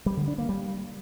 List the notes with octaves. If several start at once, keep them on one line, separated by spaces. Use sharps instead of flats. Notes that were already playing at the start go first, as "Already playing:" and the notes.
G3
D3
D4
A#3
G3